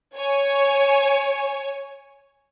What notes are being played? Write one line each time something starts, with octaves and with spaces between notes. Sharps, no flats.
C#5 G#5